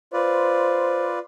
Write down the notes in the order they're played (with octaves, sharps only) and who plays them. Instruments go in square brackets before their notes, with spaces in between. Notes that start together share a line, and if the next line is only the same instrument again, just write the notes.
[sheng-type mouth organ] F4 B4 D5 [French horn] C5